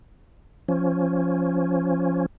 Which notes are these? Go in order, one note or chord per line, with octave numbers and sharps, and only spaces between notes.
F3 C#4